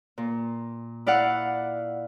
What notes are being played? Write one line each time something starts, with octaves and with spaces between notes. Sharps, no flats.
A#2
E4 D5 F5 F#5